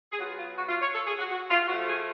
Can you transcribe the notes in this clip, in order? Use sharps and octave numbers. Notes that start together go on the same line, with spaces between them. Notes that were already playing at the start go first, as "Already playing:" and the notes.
G#4
F#3 B3 F4 F#4
F4
F#4
F4
C#5
A4
G#4
F#4
F#4
F4
F3 A3 F4 F#4
G#4